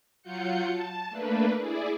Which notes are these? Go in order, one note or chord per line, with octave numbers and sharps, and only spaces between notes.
F#3 F4 F#4 G6 C#7
A5
A3 A#3 D4 B4
E4 G#4 D5